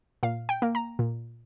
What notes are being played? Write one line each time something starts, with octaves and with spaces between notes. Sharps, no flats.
A#2 F5
G5
A#3
A#5
A#2